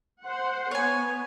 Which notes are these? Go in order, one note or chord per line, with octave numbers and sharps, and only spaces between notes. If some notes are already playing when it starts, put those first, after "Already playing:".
C5 F#5
B3 C#5 G#5